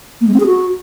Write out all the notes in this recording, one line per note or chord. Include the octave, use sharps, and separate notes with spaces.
A#3
G#3
C4
G#4
F#4